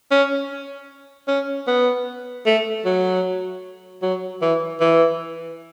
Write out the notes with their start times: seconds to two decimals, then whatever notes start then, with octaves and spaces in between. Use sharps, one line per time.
0.11 C#4
1.28 C#4
1.67 B3
2.46 A3
2.85 F#3
4.02 F#3
4.42 E3
4.80 E3